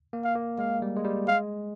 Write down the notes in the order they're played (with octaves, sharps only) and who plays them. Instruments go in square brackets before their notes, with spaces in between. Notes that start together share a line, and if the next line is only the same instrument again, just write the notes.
[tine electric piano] A#3
[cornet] F5
[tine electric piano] A#3
[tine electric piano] G#3 [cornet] F5
[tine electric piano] G3
G#3
G3
[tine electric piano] G#3 [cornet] F5